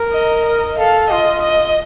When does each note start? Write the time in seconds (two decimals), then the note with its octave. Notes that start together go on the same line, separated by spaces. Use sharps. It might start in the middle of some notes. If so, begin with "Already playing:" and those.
Already playing: A#4
0.12 D#5
0.46 D#5
0.78 A4 F5
1.10 F4 D#5
1.43 D#5